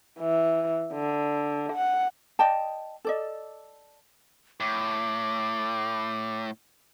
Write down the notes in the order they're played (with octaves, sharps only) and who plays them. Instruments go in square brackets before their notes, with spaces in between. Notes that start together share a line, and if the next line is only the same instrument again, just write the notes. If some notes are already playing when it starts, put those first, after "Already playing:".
[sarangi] E3
D3
F#5
[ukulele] D5 D#5 G5 A5
A4 D5 D#5
[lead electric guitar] A2 [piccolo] D6